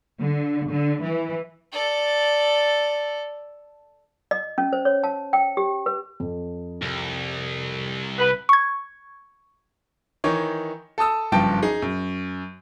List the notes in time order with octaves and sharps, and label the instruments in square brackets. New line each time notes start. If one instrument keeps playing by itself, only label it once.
[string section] D3
D3
E3
[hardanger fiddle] A4 D5
[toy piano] D#5
C#4
C5
C#5
A5
G5
G4
B4
[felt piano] F2
[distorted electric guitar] C2
[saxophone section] B4
[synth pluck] C#6 G#6
[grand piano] D#3 E3 D#4 C#5
A4 A5 D#6 E6
F#1 G2 F3 G5 A5
D#4 G#4
F#2